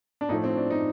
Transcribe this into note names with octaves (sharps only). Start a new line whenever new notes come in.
D4
A2 F3 A3 D#4
C4
D4
D#4